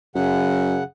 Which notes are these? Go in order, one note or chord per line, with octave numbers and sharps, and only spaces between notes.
F#2 C#3 F#5